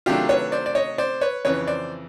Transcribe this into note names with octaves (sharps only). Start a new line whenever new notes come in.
C3 D#3 F#3 A3 D4 F4 G4
B4 C#5
C5 D5
D5
C#5 D#5
C5 D5
B4 C#5
F2 C#3 E3 B4 C#5
C5 D5